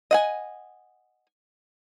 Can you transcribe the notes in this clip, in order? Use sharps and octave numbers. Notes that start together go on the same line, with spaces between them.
D#5 F#5 G#5